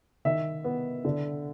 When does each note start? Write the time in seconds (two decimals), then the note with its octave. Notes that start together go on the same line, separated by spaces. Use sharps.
0.25 D#3 E5
0.64 B3
1.05 D3